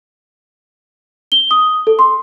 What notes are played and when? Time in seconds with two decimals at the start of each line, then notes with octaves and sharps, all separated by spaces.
1.32 G7
1.51 D#6
1.87 A4
1.99 C6